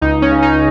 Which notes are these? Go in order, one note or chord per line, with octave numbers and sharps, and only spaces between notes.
C#2 D#4
C#4
C#3
D#4